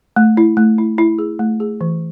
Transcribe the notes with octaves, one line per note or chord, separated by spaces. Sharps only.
A3
E4
A3
E4
E4
G#4
A3
G#4
E3